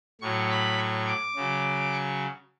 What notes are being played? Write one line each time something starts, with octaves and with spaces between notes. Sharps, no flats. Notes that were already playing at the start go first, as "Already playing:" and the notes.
A2 F#3 C#6
B5
C#6
D6
C#3 F#3
C#6